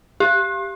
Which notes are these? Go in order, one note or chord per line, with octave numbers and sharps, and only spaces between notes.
G4